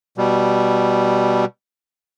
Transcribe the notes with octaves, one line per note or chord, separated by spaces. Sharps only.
B2 G3